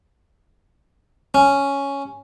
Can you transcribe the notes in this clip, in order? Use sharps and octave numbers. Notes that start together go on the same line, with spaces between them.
C#4